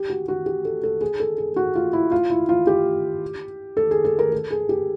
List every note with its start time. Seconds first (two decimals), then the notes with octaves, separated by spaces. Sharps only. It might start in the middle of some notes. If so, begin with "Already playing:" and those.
Already playing: G4
0.10 F#4
0.28 F#4
0.46 G4
0.65 A4
0.83 A4
1.01 G#4
1.20 A4
1.38 G#4
1.56 F#4
1.75 F4
1.93 E4
2.11 F4
2.30 E4
2.49 F4
2.67 G4
3.77 A4
3.91 G#4
4.05 A4
4.19 A#4
4.32 A4
4.51 G#4
4.69 G4